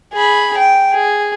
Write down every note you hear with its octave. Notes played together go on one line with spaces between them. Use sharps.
G#4 B5
G5
G#4